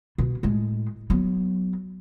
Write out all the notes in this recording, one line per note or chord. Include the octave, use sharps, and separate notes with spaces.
B2
A2 G#3
F#3 B3